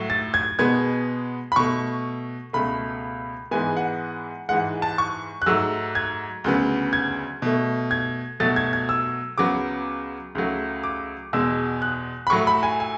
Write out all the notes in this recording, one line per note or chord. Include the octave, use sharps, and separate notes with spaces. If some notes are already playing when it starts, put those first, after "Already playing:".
Already playing: A2 F#3 A3
A6
G#6
B2 G#3 B3 G#6
B5
B2 A3 C#6
C#2 B2 A3 B5
G#2 E3 G#3 B3 G#5
F#5
G#2 E3 G#3 F#5
A5
C#6
F#6
G#2 F#3 A3 E6
G#6
D2 C#3 F#3 B3
G#6
B2 A3
G#6
B2 F#3 A3 A6
G#6
G#6
E6
C#2 C#3 F#3 B3 D6
C#2 C#3 F#3 A3
D6
E2 B2 G#3 E6
F#6
B5
A2 F#3 A3 C#6
B5
G#5
G#5